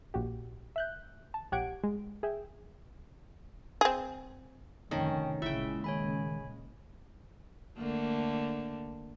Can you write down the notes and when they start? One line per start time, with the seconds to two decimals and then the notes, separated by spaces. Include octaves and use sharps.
0.14 A#1 F#4 G4
0.76 E5 F#6 G6
1.34 A5
1.52 A#1 G4 C#5 F#5 G#6 D7
1.84 G#3
2.23 G#4 E5 G5
3.81 C4 G#4
4.91 F1 D3 D#3 C#4 G5 A5 D#6
5.42 G1 A#2 C#3 G#3 E4 E5 G5
5.84 D#3 C#5 G#5 B5
7.78 D3 A3 A#3